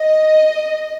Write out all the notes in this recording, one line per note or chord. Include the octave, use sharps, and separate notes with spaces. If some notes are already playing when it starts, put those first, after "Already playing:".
Already playing: D#5